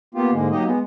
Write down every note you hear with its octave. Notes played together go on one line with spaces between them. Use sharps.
A#3 B3 F4 G4
G#2 D3 G#3 A#3
F#3 A#3 D#4 G4 D#5
G#3 B3